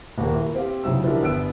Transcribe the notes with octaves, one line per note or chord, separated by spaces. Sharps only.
D#1 A#3
E4 A#4
C4 G4 C5 F5
B1 C#3 F#3 E4 E6
E3 F3 D4 E4 G4 A#4
G1 B3 E4 B4 E6 D7